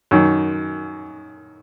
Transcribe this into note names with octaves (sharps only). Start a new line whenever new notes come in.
F#2 D#3